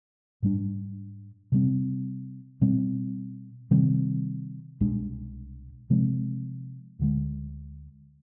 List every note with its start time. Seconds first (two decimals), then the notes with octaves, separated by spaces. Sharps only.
0.43 G#2 G3 D4
1.52 C3 G3 C4
2.61 B2 G3 C4
3.71 C3 D#3 G3 C4
4.81 C2 B2 G#3 D4
5.90 C3 F3 G#3 C4
6.99 D2 D3 G#3